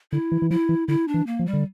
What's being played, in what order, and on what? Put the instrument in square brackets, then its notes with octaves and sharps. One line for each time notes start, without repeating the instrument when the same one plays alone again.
[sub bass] D3 [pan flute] E4
[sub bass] E3
E3
[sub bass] F3 [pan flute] E4
[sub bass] E3
[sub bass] D3 [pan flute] E4
[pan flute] D4
[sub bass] E3
[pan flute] A#3
[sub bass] F3
[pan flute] G3
[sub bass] D3